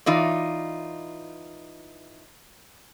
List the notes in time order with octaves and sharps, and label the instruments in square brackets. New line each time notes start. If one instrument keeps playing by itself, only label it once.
[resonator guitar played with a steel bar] E3 D#4 F4 D5